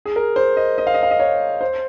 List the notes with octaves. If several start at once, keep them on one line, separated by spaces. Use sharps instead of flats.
G#4
A#4
C5
D#5
D#5
F5
D#5
F5
D#5
C#5
C5